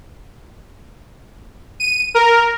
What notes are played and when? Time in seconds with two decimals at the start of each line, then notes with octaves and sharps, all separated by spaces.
1.80 D#7
2.15 A#4